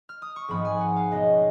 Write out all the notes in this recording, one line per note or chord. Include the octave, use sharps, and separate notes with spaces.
F6
D#6
C#6
G#1 G#2 F3 B3 B5
G#5
F#5
F5
C#2 B2 F#3 B3 D#5